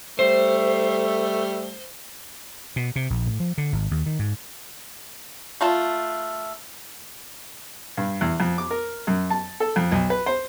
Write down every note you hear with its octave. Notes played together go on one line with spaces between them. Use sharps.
G3 A3 C5
B2
C3
A#1
A2
F3
D3
G#1
D#2
D#3
G#2
A3 F4 A5
G2
E2
F2
D6
A#4
F#2
A5
A4
F2
B1
B4
C5